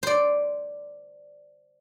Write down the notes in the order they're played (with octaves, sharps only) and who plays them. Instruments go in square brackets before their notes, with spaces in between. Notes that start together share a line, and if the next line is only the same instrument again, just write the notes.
[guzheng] C5 D5